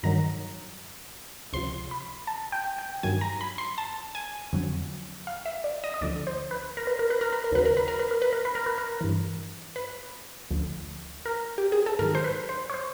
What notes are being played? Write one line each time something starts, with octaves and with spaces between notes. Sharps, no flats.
G2 D#3 F#3 A#5
C#2 C3 F3 C6
B5
A5
G5
G5
G2 D#3 F#3 G#5
A#5
B5
C6
A5
G#5
F2 D3 F#3
F5
E5
D5
D#5
D#5
D2 D3 F3 D5
C5
B4
A#4
B4
A#4
B4
A#4
B4
A#4
D#2 C#3 F#3 B4
A#4
B4
A#4
B4
A#4
B4
A#4
B4
A#4
B4
A#4
G2 E3
B4
D2 D3 F3
A#4
G4
G#4
A4
G#2 D#3 F#3 A#4
C5
B4
C5
C#5
C5